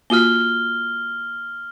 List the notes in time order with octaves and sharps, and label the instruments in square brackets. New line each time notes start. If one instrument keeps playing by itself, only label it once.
[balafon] A#3 F4 F#4 [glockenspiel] F6 G7